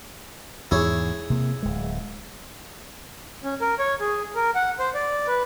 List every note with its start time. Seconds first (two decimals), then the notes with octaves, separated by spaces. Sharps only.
0.71 E2 G#2 E4 G#4 C#5
1.30 C3 A#3
1.62 D1 G#3
3.44 C#4
3.61 A#4
3.79 C#5
4.00 G#4
4.35 A#4
4.55 F#5
4.79 C5
4.94 D5
5.27 B4